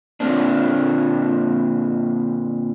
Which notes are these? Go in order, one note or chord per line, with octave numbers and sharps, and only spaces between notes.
A#2 D3 F3 A#3 C4 D4